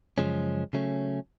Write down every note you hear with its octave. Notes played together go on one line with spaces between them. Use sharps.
F#2 C#3 F3 G#3 C#4
C#3 F#3 A3 C#4